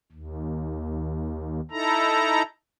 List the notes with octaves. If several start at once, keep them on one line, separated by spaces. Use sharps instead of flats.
D#2
D#4 E4 A4 A#5